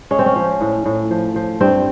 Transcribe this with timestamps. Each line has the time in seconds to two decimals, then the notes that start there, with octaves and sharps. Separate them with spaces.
0.11 G#3 C#4
0.19 C4
0.26 C#4
0.36 F3
0.61 A2
0.86 A2
1.11 F3
1.36 F3
1.61 G2 C4